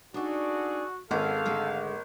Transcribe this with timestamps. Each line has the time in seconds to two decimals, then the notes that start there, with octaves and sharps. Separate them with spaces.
0.14 D4 D#4 F#4 G#4 A4 D5
1.11 G#1 B3 C#4 G#4 A4 F5
1.45 D3 G#3 A3